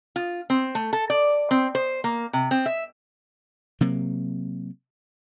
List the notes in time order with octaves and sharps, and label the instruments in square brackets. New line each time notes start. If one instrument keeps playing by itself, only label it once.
[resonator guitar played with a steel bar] F4
C4
A3
A4
D5
C4
C5
A#3
C3
C4
E5
[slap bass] C3 F#3 A#3